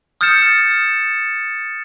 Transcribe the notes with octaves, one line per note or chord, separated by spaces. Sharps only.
D#6 F6 G6 A6 C#7 E7